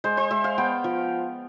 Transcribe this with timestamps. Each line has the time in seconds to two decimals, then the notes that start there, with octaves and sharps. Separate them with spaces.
0.04 G#3 C5
0.17 C5
0.31 G#3 E5
0.44 F5
0.58 B3 G5
0.84 F3